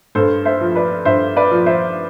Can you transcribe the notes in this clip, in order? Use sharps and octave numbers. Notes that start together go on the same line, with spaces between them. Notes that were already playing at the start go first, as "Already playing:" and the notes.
G2 A4 C5
C5 E5
F3
B4 D5
G2 C5 E5
B4 D5
F3
C5 E5